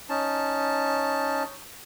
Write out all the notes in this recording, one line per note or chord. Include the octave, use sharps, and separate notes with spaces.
C#4 D#4 A5